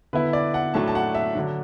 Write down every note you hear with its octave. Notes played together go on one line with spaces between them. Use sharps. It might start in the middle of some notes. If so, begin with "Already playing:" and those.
D3 B3 E4 B4
D5
F#5
A2 F#3 A3 D4 A5
A5
F#5
E5
D3 F#3 D4